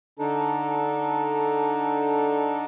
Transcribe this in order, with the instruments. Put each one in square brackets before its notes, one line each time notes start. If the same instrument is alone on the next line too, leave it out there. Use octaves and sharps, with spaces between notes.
[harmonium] D3 D4 D#4 A4